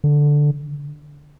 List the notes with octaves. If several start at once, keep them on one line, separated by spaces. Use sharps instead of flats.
D3